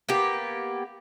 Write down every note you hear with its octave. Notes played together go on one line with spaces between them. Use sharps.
A#3 B3 G4